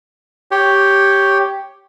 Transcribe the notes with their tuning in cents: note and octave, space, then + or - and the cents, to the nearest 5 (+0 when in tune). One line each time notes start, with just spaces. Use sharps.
G4 +0 C#5 +0